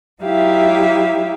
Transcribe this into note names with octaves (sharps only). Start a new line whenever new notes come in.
F#3 D#4 E4 G4 E5 F5